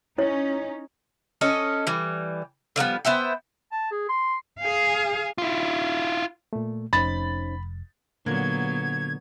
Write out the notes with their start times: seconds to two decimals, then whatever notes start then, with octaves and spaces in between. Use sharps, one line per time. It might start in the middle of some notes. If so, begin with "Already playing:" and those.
0.18 C#4 D#4 E4 C#5
1.41 C#4 A4 D#5
1.87 E3 G3
2.76 D3 F3 G3 B3
3.05 B3 C5 E5 G5
3.72 A5
3.91 G#4
4.09 C6
4.60 G#4 F5
5.38 E4 F4
6.53 A#2 A3
6.93 F1 C#4 D#4 C5 B5 A6
8.26 A#2 D3 F#3 A#3 B3 G#6